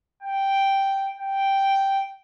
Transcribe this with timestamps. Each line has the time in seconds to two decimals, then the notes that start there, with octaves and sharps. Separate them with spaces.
0.22 G5
1.17 G5